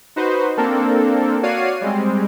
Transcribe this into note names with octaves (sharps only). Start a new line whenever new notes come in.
D#4 F#4 B4 C5
A#3 C4 D4 A4 A#4
F#4 C#5 D5 F5 C7 D#7
G3 G#3 C4